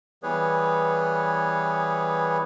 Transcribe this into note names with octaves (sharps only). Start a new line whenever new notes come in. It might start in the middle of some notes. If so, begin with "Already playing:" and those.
E3 G3 B3 G#4 B4 C#5